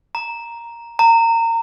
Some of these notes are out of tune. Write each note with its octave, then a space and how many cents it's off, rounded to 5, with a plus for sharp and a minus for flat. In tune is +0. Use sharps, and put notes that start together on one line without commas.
A#5 +0
A#5 -25